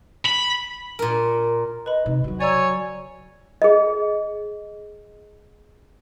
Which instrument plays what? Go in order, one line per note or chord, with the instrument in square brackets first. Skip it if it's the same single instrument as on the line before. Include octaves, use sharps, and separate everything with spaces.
[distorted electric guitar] B5
[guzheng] A#2 A#4
[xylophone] B4 B5 [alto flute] D#5
[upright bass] C3 [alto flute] D#4
[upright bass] C#3 F#3 [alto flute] F#4
[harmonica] C#5 G#5 [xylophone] D5 A#5 E6
[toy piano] G#4 D#5